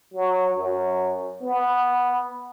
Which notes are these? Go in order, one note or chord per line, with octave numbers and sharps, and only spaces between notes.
F#3
F#2
B3